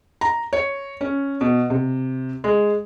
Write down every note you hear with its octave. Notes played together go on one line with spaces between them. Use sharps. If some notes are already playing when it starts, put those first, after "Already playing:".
A#5
C#5
C#4
B2
C3
G#3